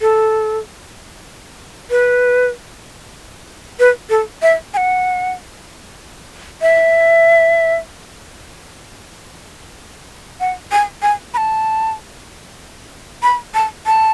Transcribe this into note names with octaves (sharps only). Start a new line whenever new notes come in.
A4
B4
B4
A4
E5
G#5
F#5
E5
F#5
G#5
G#5
B5
A5
B5
A5
A5